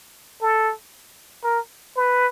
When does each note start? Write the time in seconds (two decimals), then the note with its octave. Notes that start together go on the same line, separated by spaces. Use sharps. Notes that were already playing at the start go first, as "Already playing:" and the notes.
0.42 A4
1.44 A#4
1.96 B4